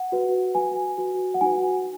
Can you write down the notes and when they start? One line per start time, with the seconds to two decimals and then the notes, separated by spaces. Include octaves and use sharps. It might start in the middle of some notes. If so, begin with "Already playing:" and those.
Already playing: F#5
0.12 F#4 B4
0.54 F#4 B4 G#5
0.98 F#4 B4
1.34 F#5
1.41 D#4 F#4 B4 G#5